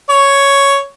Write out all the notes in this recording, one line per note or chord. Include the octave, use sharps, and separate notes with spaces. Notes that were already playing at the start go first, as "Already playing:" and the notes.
C#5